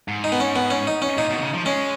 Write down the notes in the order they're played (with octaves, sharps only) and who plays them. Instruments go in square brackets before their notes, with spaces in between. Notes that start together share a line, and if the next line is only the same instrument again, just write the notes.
[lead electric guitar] G#2
[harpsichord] D#4
B3
C#4
B3
C#4
D#4
C#4
[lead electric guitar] A#2 [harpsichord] D#4
[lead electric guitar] B2
D#3
C#3
F3
[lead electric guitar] G#3 [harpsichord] C#4